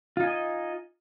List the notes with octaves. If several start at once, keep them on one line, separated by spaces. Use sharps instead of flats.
D#4 F4 D#5 G#5